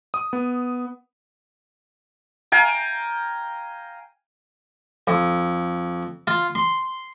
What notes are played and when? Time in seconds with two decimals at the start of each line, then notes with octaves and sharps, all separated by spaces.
0.14 D#6
0.33 B3
2.52 F5 G5 G#5 A#5
5.07 F2
6.27 F4
6.55 C6